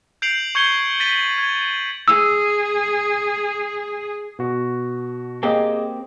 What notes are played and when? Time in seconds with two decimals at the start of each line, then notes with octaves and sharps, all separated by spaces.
0.22 G6 C7 D7 F7 F#7
0.55 C#6 G6 G#6 C#7 G7
1.00 A6 B6 D#7 F#7
1.38 G#6
2.08 G#4 E6
4.39 B2 F#4
5.43 A#3 C4 G4 G#4 D#5 G#5